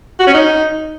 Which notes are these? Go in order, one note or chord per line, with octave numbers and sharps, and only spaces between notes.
F#4
C#4
D#4